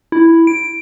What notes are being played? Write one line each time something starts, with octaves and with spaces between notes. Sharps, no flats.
E4
D7